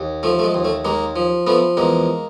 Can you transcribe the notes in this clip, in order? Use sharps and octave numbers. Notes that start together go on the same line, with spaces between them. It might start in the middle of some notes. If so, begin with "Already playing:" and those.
Already playing: D#2
F3 A3
A3
G#3
D#2
A3
D#2 G#3 A#3
F3
F3 A3 B3
E2 G#3 A#3